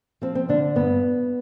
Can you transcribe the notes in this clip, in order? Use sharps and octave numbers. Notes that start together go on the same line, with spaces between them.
F3 C4
C4
D3 D4
G2 B3